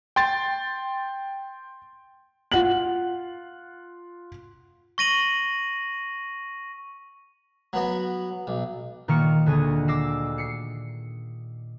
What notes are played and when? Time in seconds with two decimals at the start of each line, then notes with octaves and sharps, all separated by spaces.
0.16 G5 C6 A6
2.52 F4 F#5 F#7
4.98 C#6 A#6 D#7 F#7
7.73 F#3 B3 F#4
8.47 B1
9.08 A#2 D#3 A#3 C#6 F6 C#7
9.46 D2 D3 G#4 D#5 D#7
9.88 D6 E6 A#6 C7 E7
10.38 C7 C#7